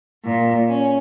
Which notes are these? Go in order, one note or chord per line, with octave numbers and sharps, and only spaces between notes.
A#2
C#4